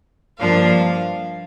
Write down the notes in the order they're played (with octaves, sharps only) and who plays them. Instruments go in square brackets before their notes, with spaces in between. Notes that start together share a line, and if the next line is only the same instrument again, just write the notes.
[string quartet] G2 F3 A#3 D4 F5